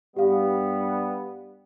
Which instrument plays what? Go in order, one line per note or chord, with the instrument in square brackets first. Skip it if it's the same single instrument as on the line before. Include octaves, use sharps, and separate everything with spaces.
[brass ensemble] G2 G3 B3 [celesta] G4 F5